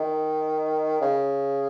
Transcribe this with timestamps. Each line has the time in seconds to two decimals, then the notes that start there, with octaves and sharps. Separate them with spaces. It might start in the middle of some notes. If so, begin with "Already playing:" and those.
Already playing: D#3
1.01 C#3